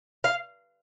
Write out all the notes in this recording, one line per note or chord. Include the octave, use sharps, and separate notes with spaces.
F5